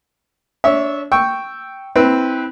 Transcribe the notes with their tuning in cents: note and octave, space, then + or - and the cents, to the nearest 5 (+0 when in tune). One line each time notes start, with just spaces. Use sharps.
D4 -25 C#5 +0 E5 -15
G5 -5 C#6 +0 E6 +0
C4 +0 E4 -30 B4 +0